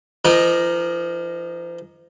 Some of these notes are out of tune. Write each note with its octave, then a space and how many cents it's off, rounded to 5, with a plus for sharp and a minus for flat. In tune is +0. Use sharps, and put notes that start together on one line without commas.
F3 -40 D#4 +0 A#4 +0